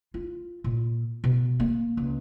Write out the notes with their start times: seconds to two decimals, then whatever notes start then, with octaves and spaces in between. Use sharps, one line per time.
0.14 F4
0.64 A#2
1.24 B2
1.60 A#3
1.97 C#2